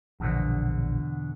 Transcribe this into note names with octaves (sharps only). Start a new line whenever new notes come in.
A#1 E2 B2 D3